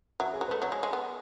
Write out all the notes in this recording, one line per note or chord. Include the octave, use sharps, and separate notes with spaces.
F#3 E5
G#4
F#3
B4
A3
F#3 C#5
G#3
G#3
B3